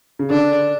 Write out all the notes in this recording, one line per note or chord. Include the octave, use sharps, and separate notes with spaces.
C#3
D3 D4